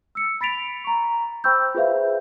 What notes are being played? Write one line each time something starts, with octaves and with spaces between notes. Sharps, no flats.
E6 C#7
B5 A6 B6 D7 F7
A#5 C#6
C5 G5 B5 C#6 E6 G6
F4 G#4 B4 C5 E5 F5